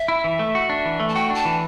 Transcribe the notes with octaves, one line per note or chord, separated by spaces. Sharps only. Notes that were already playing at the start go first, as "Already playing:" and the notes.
Already playing: E5
E4
E3
A3
F#4
D4
E3
A3
A5
F#4 G5
D4 A5
E3